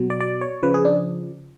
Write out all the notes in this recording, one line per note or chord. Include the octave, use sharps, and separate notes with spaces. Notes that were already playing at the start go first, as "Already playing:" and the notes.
Already playing: B2 F#3
D5
D5
C#5
C#3 F3 B4
G#4
D4